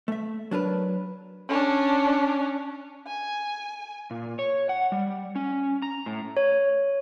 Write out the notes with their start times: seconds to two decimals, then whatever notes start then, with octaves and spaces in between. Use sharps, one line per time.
0.08 A3 E5
0.51 F#3 D4 A#4 B4
1.49 C#4 D4
3.07 G#5
4.11 A#2
4.39 C#5
4.69 F#5
4.92 G3
5.36 C#4
5.82 A#5
6.06 A2
6.37 C#5